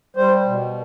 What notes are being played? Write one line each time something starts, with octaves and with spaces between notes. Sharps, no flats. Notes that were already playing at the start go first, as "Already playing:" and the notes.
G3 C5
B2